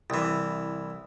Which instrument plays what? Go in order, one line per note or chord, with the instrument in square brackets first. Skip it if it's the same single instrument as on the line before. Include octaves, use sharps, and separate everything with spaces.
[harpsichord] C2 E3